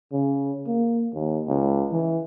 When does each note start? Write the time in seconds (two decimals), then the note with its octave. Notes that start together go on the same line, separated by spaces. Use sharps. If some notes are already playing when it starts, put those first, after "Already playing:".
0.12 C#3
0.67 A#3
1.14 D#2
1.48 C#2
1.92 E3